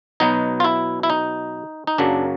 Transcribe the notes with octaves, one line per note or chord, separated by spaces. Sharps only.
B2 F#3 B3 D#4
F4
E4
E4
D#4
D#4
F#2 C#3 F#3 A#3 D4